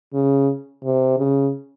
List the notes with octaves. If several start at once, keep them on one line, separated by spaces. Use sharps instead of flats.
C#3
C3
C#3